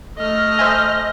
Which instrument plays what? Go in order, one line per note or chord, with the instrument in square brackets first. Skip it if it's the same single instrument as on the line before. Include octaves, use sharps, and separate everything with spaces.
[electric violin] A3 F6 [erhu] D#5
[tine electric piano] C5 E5 G#5